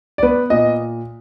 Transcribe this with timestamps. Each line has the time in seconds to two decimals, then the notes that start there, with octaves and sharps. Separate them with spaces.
0.18 D5
0.23 B3 B4
0.50 A#2 D#5